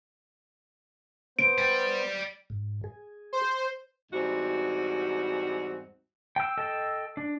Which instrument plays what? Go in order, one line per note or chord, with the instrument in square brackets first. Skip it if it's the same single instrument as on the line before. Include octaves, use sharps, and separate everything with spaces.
[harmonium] B3 C5 [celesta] D7
[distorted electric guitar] D5 G5
[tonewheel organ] G#2
G#4
[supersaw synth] C5
[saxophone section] E2 G#2 G3 C4 F#4
[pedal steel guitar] G5 E6
A4 D#5 G5 E6
D4